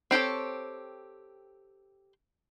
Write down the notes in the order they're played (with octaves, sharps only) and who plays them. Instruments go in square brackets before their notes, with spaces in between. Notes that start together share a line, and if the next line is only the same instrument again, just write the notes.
[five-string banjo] C4 G4 A4 C#5